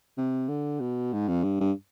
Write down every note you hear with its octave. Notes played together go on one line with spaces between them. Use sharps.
C3
D3
B2
G#2
F2
G2
G2